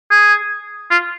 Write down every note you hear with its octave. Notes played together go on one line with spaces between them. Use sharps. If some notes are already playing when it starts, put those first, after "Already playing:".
G#4
F4